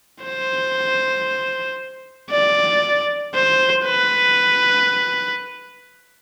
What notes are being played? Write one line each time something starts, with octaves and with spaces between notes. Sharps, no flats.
C5
D5
C5
B4